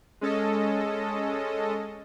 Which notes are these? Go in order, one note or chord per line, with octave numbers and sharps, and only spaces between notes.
G#3 C#4 A4 D#5